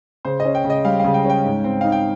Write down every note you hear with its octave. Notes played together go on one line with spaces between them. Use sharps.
C#3 C5
D#5
C#4
G5
C#3
D#5
G3 F5
C#3 F5
G5
C#4
G5
G#2
C4
D#4 F5
G5